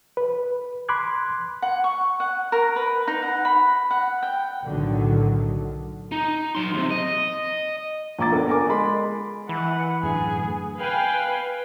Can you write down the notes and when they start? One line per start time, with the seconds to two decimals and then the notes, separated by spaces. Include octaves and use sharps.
0.17 B4
0.89 B5 C6 D6 F#6 G#6
1.62 F#5
1.84 C#6
2.20 F#5
2.52 A#4
2.76 B4
3.07 D#4
3.22 F#5
3.45 B5
3.91 F#5
4.23 G5
4.66 B1 A2 D3 D#3 F#3
6.12 D#4
6.55 F#3 C6
6.74 D#2 C3
6.90 D#5
8.19 A#1 A#2 A#5 D6 A6
8.32 B3 D4 A4 A#4
8.49 A#4 G#5 D6
8.69 G#3 B5 C6
9.49 E3 B4 F#5
10.03 F#2 A2 D3 G#4
10.78 B4 F5 G5 G#5